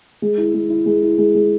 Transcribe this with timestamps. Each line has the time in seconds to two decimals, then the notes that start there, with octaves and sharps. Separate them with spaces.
0.22 G#3
0.37 E4
0.54 G#3
0.70 E4
0.86 G#3
1.03 E4
1.18 G#3
1.35 G#3